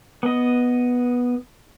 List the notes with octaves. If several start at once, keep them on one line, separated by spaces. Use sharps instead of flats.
B3 D#5